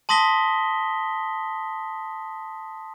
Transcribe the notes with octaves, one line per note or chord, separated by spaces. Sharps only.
A5 C6 D#6 A#6 B6 G7